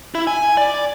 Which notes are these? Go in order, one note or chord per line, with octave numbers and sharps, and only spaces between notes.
E4
G#5
D5